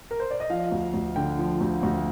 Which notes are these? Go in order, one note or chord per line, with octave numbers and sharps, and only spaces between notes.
A#4
C5
D5
D#5
F3 F5
D2
D2
D3 G5
F3
D2
D2